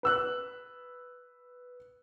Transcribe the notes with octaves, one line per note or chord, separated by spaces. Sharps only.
B4 E6 F#6